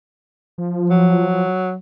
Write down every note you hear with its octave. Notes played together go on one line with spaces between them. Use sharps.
F3
F#3